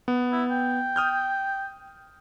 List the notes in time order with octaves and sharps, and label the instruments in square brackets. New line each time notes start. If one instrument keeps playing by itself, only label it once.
[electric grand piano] B3
[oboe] E4
G5
[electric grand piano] D#6 F6 G6